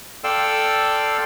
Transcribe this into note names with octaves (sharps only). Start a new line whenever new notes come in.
A4 D5 F5 G5 C6 E6